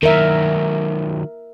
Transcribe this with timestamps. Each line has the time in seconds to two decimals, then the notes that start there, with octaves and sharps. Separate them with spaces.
0.03 D#3 F#3 A#4 E5